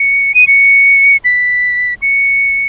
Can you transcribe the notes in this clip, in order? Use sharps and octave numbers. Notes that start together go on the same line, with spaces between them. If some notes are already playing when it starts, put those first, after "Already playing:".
Already playing: C#7
D#7
C#7
B6
C#7